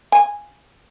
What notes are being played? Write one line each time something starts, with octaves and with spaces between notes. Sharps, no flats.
G#5